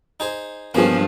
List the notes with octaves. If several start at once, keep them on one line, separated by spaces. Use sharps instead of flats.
D#4 G#4 C5
G2 F3 A#3 B3 C#4 G#4